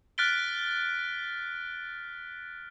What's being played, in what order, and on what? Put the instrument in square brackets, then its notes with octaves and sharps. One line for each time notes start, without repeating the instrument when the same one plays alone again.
[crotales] F6 F#6 A6 B6 D7 G7